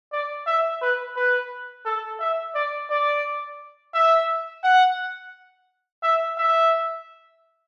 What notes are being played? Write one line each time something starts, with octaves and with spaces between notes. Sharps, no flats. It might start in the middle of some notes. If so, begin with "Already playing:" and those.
D5
E5
B4
B4
A4
E5
D5
D5
E5
F#5
E5
E5